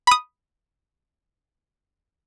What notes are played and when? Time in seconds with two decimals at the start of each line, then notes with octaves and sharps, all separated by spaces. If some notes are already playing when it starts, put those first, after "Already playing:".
0.07 B5 D#6